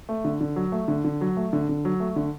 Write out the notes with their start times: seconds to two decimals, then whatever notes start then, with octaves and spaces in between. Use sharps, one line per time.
0.09 A3
0.25 D3
0.41 D3
0.56 F#3
0.72 A3
0.88 D3
1.05 D3
1.21 F#3
1.37 A3
1.53 D3
1.69 D3
1.85 F#3
2.00 A3
2.16 D3